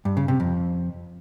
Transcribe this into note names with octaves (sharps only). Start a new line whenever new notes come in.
G2
C#3
C3
F2